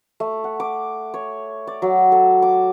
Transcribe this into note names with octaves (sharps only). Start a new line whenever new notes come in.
A3
F#5
D6
C#5
D5
F#3
A4
D6